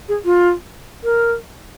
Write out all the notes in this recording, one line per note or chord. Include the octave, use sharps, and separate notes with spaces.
G#4
F4
A#4